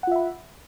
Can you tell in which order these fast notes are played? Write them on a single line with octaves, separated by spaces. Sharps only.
F#5 F4 E5 B5